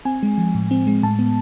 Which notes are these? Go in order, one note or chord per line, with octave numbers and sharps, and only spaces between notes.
C4 G#5
G#3
F3
A2
C4
G#3
A2 A5
B3